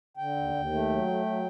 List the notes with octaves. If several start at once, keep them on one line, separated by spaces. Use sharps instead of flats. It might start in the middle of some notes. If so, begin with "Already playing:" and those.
D3 G5
D#2
D#2
A3
F#3
A3
F#3